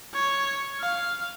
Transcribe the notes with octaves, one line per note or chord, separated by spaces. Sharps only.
C#5
F5